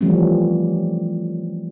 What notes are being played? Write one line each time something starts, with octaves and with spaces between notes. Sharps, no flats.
E3 F3 G3 A3 C4 C#4